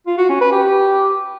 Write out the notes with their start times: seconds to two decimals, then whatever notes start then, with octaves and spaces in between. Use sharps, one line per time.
0.07 F4
0.18 F#4
0.29 C#4
0.41 B4
0.52 G4